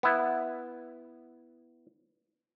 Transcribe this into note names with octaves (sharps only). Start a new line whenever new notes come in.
B3 E4